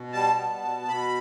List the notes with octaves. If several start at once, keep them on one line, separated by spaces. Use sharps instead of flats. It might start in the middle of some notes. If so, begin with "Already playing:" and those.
Already playing: B2
G3 A5
B3
B2
B2 B5